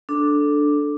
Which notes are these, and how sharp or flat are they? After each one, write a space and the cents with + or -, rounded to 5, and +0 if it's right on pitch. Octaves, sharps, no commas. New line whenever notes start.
D4 +0 A4 -5